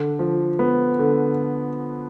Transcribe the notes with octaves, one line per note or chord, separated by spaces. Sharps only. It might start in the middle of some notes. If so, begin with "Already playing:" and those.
Already playing: D3
F3
B3
D3